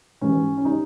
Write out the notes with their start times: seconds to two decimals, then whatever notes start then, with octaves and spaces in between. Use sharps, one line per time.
0.21 G#2 E3 G3 C#4
0.58 C#4
0.65 G3 D#4